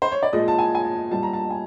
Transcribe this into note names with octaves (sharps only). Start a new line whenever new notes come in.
C5
C#5
D5
A#2 F3 G#3 D#5
A5
G#5
G#5
A5
A#2 G3 A5
A#5
A5
G#5